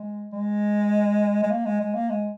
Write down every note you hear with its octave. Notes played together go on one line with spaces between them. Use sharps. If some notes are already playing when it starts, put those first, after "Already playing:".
Already playing: G#3
G#3
G#3
A#3
G#3
G#3
A#3
G#3